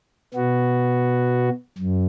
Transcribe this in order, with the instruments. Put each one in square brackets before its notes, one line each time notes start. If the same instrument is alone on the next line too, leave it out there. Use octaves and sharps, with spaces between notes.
[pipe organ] B2 B3 F#4
F#2